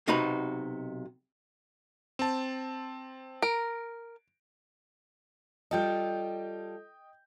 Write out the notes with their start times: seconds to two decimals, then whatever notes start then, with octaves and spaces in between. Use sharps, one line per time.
0.07 B1 C3 D#4 F#4 B4 A#5
2.19 C4 A5
3.42 A#4 D7
5.71 G3 F4 A4 D#5 G5 G6